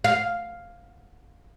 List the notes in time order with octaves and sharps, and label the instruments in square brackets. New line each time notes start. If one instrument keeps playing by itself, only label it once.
[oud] F5